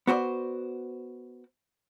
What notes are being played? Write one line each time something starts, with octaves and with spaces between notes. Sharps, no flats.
B3 F#4 C5 D5